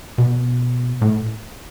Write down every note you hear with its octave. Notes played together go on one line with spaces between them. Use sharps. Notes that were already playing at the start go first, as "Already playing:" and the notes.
B2
A2